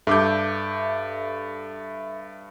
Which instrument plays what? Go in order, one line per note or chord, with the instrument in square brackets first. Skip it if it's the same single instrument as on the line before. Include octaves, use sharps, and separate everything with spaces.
[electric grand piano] G2 D6 G6 [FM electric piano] A4 E5